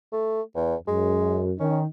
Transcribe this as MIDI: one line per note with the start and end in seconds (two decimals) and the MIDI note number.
0.12 0.41 57
0.56 0.75 40
0.87 1.52 42
0.87 1.44 56
1.59 1.84 51
1.59 1.79 61
1.59 1.84 63